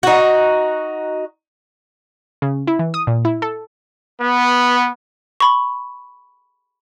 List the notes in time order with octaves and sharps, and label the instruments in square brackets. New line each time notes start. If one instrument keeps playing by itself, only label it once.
[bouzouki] D#4 F#4
[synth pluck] C#3
E4
E3
D#6
A#2
E4
A4
[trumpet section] B3
[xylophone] B5 C#6